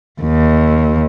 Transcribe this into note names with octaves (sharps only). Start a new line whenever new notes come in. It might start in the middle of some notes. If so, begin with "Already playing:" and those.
D#2